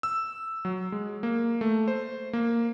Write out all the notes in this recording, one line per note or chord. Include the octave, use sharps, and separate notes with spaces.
E6
F#3
G#3
A#3
A3
C5
A#3